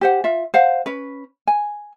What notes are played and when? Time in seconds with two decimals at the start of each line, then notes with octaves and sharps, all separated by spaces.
0.01 G4 C5 F#5
0.24 F4 E5
0.54 C5 F5 F#5
0.86 C#4 B4
1.47 G#5